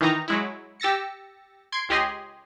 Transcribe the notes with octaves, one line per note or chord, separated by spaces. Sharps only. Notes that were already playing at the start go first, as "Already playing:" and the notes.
D#3 E3 D#4 A#5
F#3 G#3 E4
G4 E6 A6 A#6 C#7
C6 G#6 D7
C#2 G4 G#4 D#5 C6